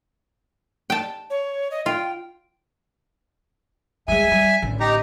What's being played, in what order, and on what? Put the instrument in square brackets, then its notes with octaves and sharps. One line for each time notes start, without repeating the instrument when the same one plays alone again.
[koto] G5 A5
[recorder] C#5
D#5
[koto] F4 [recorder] G5
[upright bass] G3 G#3 [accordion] E5 G#5
[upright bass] G3
A1 D3
[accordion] D#4 G4 A#5